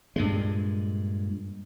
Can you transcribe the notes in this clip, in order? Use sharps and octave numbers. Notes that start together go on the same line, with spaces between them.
G2 A#2 G#3